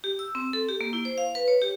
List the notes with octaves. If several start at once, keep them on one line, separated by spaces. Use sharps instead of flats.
G4
E6
C4
A4
G4
A#3
E4
C5
F5
B4
C#5
G4